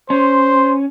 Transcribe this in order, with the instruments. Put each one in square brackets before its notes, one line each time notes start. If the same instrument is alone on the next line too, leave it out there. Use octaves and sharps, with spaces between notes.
[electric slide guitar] C#4 [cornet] C5 [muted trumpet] C6